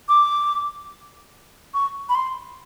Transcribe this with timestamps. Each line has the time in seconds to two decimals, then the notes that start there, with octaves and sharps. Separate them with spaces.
0.09 D6
1.74 C#6
2.09 B5
2.15 C6